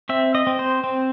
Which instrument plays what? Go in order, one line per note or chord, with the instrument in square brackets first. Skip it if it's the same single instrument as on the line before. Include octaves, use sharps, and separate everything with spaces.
[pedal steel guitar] C4 E5
D#5
C4
C5
C4